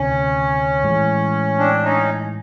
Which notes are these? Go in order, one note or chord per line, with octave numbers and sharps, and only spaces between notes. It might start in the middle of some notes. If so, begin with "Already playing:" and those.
Already playing: D2 C3 D#3 C#4
A2 E3 G#3
C4 D4
C#4 D#4